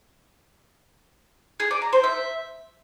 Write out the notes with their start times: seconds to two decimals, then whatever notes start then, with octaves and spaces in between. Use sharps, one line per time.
1.60 G#4
1.71 D5
1.82 A#5
1.93 C5
2.04 E5